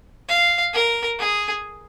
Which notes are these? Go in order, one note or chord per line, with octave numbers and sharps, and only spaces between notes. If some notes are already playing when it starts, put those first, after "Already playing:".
F5
A#4
G#4